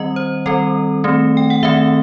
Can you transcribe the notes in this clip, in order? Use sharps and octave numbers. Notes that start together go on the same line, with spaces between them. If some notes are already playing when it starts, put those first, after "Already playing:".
Already playing: D#3 G3 C4 D#5
C5
D#3 G3 C4 A4
D#3 A3 C4
G5
F#5
D#3 A3 C4 E5